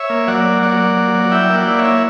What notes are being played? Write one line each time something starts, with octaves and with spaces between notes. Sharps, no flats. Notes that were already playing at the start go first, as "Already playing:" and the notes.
Already playing: C#5 E5
A#3
F#3 D5 F#5
A#3
F#3 D5 F#5
A#3
F#3
F#3
E4 E5 G5
A#3
D5 F#5
E4
C#5 E5
E4